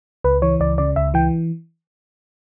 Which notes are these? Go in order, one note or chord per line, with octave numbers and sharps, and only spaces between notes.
C#2 B4
E3 C#5
C#2 D5
C#3 D5
C#2 E5
E3 G5